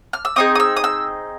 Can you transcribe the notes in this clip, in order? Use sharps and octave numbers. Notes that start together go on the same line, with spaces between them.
F6
E6
C4 D#4 G#4 D#6
D#6
E6
D#6
E6